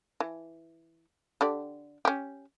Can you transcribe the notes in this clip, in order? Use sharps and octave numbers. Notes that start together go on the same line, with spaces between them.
E3
D3 G4 D5
C#4 G4